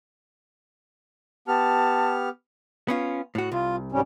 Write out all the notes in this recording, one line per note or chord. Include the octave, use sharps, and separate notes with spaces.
B3 G4 A5 F6
B3 C#4 F4
A2 F#4
C2 F4
G#2 G3 C#4